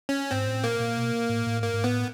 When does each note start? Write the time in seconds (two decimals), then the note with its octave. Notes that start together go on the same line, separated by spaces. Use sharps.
0.09 C#4
0.31 G#2 C4
0.47 A2
0.63 A#2 A#3
0.80 A#2
0.97 B2
1.29 A2
1.46 A2
1.62 G#2 A#3
1.73 G#2
1.84 A2 B3